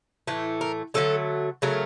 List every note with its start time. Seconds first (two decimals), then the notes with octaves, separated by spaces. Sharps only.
0.27 A2 E3 A3
0.61 A#4
0.94 D3 F#3 A3 A4
1.62 C#3 F#3 A3 A#4